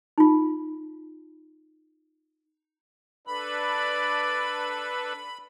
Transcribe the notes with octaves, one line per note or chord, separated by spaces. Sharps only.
D#4 F4
D4 A4 B4 D5 B5